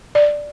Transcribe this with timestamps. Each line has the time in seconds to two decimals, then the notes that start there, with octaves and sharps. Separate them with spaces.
0.15 D5